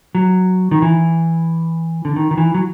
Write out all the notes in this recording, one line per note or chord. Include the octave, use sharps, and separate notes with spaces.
F#3
D#3
E3
D3
D#3
D#3
E3
F#3